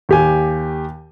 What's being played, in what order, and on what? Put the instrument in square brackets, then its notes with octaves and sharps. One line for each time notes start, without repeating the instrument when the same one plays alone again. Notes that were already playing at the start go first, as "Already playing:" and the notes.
[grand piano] D#2 G4 G#5